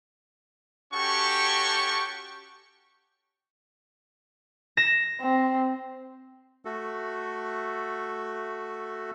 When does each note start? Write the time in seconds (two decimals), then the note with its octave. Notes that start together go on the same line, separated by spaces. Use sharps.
0.93 C#4 F#4 G4 A4 G5 C#6
4.77 A#6 E7
5.21 C4
6.65 A3 F#4 A4